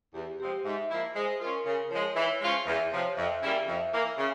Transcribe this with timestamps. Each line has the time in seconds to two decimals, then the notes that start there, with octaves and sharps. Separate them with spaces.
0.14 E2 G4
0.40 C3 F3 G#3 C4 G4
0.65 G#2 E5
0.90 F3 A#3 E4
1.15 G#3 C5
1.41 C#4 F4 A#4
1.66 C#3 A#4
1.91 F3 G#3 C#5
2.16 E3
2.41 G#3 C#4 F4 C5
2.67 E2 E5
2.92 C3 F3 C#5
3.17 F2 E5
3.43 C#3 G3 A#3 E4
3.67 F2
3.93 E3 A#3
4.18 C#3